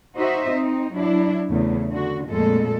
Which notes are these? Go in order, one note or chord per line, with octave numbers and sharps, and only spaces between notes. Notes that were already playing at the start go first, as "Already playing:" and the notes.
D#4 F#4 C5 D#5 E5
C4 D#4
F#3 D4 E4
E2 C#3 A3
D3 F#4
F2 A#2 G#3 A3 A4